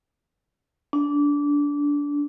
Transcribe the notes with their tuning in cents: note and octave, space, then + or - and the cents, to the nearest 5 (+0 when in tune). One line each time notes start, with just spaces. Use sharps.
D4 -20